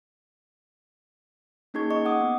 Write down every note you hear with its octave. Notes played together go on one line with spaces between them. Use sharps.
A#3 C#4 D#4 G#4 C#6 G#6
D#5 C#6
D#5 F#5 D6 D#6
B3